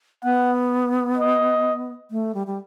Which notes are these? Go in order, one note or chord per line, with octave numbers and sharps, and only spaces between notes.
B3 F#5
D#5
A3
G3
G3